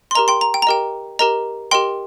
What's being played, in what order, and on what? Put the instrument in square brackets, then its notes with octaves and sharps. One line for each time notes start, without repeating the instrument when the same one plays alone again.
[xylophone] C6
G4 A#4 D#5 A#5
G5 C6
A#5
G5
A#5
G4 A#4 D#5 G5
G4 A#4 D#5 A#5
G4 A#4 D#5 G5 C6